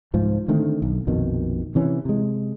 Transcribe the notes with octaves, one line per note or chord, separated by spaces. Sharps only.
C2 G#2 F3
D3 D#3 A3 C4
B1
A#1 F2 B2 D#3
C3 E3 C#4
C3 G#3